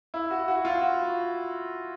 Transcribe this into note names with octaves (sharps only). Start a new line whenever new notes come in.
E4
F#4
F#4
F4
F#4